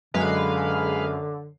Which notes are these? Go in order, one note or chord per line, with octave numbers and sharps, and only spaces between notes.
F#2 D3 G#3 B4 F5